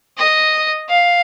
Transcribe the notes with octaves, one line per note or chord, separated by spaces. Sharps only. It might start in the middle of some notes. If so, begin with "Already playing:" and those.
D#5
F5